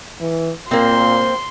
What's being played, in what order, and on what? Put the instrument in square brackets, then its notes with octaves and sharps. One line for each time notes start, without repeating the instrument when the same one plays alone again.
[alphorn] E3
[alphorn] A#2 [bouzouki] A#3 C4 [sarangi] C6